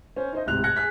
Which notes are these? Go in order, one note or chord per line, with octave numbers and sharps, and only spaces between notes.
C#4 C5
D#4 C5 D#5
D1 G#2 C3 F#6 F7
F#6 G#6 A#6 C#7
G#4 F#6 B6